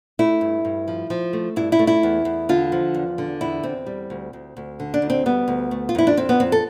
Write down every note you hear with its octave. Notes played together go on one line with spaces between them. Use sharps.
A3 E4
G2
G2
F3
F3
A3
G2 E4
E4
A3
E4
E2
E2
D3 F4
F3
E2
D3
E2 E4
E2 C4
G3
D2
D2
D2
D3
D4
D2
C4
G3 B3
D2
A3
F4
F2 E4
D4
F2 C4
B3
F2 C4
A4